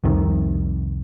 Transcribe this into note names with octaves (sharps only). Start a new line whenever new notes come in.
C2 F2 C3 D#3